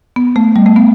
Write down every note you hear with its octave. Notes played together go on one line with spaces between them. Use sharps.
B3
A3
G3
A3
B3